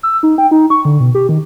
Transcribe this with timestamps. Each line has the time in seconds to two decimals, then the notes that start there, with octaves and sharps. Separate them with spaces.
0.03 E6
0.23 D#4
0.38 G5
0.51 D#4
0.70 C#6
0.85 D3
1.00 B2
1.15 G4
1.29 D#3